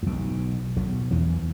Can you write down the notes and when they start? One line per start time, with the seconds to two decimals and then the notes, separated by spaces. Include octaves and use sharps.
0.03 A2
0.06 B1 B2
0.77 B1 B2
1.11 E2 E3